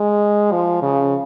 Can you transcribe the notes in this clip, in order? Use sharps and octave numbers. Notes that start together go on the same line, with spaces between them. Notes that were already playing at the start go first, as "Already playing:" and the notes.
Already playing: G#3
F3
C#3